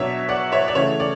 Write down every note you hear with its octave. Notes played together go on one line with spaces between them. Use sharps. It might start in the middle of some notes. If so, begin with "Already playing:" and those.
Already playing: B2 F#3 B3 D4 C#5 E5
D5 F#5
C#5 E5
D5
C#3 E3 A3 C#5
D5